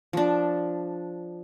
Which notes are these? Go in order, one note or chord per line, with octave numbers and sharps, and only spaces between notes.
F3 D4